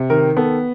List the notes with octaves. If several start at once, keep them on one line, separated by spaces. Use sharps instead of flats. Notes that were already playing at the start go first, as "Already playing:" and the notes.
Already playing: C3
D#3 A#4
B3 A4